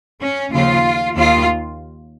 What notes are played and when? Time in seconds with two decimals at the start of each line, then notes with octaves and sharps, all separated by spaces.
0.21 C#4
0.52 D#2 C#3 F3 F4
1.15 D#2 D#3 F4